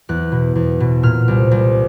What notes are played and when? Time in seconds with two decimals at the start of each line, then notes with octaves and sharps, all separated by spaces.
0.09 E2 F#6
0.32 B2
0.55 E2
0.80 B2
1.03 A#2 F6
1.28 C2
1.51 C2